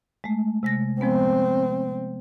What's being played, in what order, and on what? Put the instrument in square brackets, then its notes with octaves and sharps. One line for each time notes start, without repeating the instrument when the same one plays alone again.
[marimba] G#3 A3
C3 G#3 A#6
[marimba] F3 G#3 B3 [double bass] C4